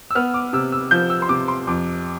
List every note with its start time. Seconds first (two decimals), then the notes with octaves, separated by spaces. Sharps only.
0.11 E6
0.15 B3 F6
0.34 D6
0.53 C3 E6
0.72 E6
0.91 F3 G6
1.10 E6
1.22 C6
1.29 C3 D6
1.48 C6
1.67 F2 D6